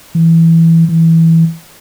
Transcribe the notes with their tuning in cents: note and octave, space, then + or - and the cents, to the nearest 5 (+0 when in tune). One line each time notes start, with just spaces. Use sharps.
E3 +0
E3 -10